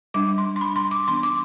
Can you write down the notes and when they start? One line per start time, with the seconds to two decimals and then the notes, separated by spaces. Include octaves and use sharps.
0.14 G3 D4 D6
0.38 C6
0.56 C6
0.61 G3 D4 B5
0.76 C6
0.91 D6
1.08 E3 B3 D4 C6
1.23 D6